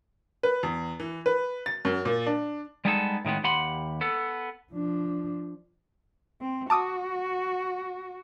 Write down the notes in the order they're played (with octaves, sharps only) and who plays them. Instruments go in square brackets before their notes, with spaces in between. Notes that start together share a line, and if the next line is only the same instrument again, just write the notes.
[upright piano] B4
E2
E3
B4
A6
F#2
A#2
D4
[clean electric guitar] G3 G#3 B3 D#4 G#4 A4
A2 D#3 G#3 B3
D#2 G4 F#5 B5 C6
B3 A4
[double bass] F3 D4
[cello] C4
[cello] F#4 [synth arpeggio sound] A5 D6 D#6